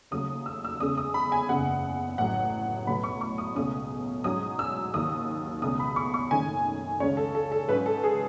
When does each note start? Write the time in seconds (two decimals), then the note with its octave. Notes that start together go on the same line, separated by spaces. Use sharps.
0.11 D#2 C#3 F#3 A3 D#6
0.46 E6
0.64 E6
0.80 E2 C#3 G#3 C#4 D#6
0.97 D#6
1.14 B5
1.32 G#5
1.49 F#1 E2 C#3 F#5
2.18 A1 A2 F#3 F#5
2.86 B1 A2 F#3 B3 B5
3.04 C#6
3.21 C#6
3.38 D#6
3.55 C#2 B2 A3 C#4 D#6
4.24 G#2 F#3 C#4 D#6
4.59 E6
4.94 D#2 D#3 F#3 D#6
5.62 C#2 B2 A3 C#4 D#6
5.80 B5
5.96 C#6
6.14 C#6
6.31 F#1 F#2 D#3 A3 C#4 G#5
7.00 C#2 C#3 G#3 C#4 C#5
7.17 A4
7.35 A4
7.52 A4
7.69 G#2 F#3 C#4 B4
7.86 A4
8.04 G#4